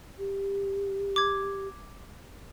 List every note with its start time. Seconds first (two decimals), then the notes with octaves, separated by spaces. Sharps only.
0.19 G4
1.16 D6 G#6